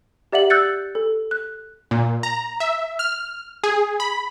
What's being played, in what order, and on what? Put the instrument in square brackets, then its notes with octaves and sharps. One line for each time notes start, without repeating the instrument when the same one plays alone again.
[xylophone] G4 D5 E5 F#5 F#7
E6 F#6 G6 A6 C#7
A4
F#6
[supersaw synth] A#2
A#5
E5
F6
G#4
B5